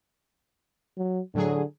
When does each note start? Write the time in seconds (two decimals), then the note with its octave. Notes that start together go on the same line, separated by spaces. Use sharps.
0.97 F#3
1.35 A2 D3 F#3 G#4